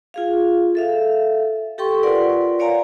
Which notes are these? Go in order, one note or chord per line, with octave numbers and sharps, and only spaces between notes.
F4 G#4 F5
A4 E5 F5
G4 A4 G5 C6 C#6
F4 A#4 B4 D5 F#5 C6
C#5 D5 F5 G#5 A#5